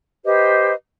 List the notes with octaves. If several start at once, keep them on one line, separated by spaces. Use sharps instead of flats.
G4 B4 C5 D#5